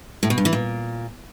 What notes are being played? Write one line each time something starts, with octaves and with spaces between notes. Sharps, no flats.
A2
B2
G2
E3
A#2